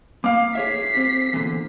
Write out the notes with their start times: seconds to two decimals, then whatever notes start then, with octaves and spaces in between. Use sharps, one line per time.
0.24 A#3 F5 D6
0.55 G#4 C#5 E5 B6 C7
0.97 C4
1.33 E2 A#2 D3